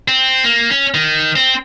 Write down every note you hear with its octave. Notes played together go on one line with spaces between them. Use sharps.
C4
A#3
C#4
D#3
C4